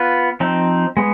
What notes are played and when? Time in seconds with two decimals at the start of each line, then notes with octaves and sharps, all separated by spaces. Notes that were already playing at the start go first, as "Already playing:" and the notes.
Already playing: B3 F4 B4
0.40 F3 C4 D#4
0.97 G#3 B3